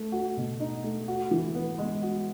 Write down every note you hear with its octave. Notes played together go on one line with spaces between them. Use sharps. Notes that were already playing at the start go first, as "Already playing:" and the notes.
Already playing: A3
F#4
B2
D#4
A3
F#4
E3
B3
G#3
F#4